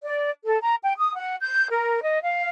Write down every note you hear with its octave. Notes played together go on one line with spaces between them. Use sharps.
D5
A4
A#5
G5
D#6
F#5
G6
A#4
D#5
F5